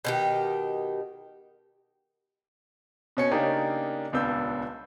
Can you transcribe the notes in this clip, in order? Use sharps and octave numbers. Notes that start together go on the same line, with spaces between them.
B2 D#3 G4
B2 C#4 C#7
C#3 A#3 D4 D#4 G4
D#1 C#2 B3 D4 E6 G6